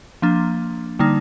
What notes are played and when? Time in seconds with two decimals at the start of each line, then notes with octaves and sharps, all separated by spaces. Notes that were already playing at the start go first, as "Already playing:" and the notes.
0.22 F3 A#3 D4
0.99 D3 G3 A#3 D#4